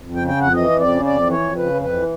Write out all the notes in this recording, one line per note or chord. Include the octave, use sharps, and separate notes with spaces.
F2
G5
C#3
G5
F2 F#5
E3 D#5
F2
D5
C#3
F2 D5
E3
C#5
F2
C#3 B4
F2
B4
E3